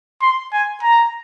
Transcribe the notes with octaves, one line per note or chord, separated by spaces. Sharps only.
C6
G#5
A#5